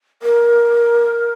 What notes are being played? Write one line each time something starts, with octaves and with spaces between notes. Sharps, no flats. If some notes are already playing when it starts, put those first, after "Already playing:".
A#4